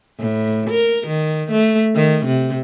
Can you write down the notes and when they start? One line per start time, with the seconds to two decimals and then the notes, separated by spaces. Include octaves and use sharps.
0.20 A2
0.70 A#4
1.07 D#3
1.51 A3
1.96 D#3
2.26 C3